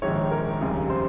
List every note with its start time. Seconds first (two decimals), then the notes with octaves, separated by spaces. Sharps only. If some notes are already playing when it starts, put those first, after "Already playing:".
0.02 A#1 G#2 D#3 G#3 C#5
0.32 A#4
0.61 F1 D#2 C#3 G3 G#4
0.90 C5